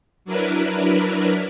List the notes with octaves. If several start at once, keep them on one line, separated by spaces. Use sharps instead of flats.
F#3 D4 E4 A#4 B4